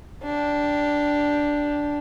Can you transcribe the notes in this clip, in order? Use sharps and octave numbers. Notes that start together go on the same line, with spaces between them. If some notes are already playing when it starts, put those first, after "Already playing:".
D4 G4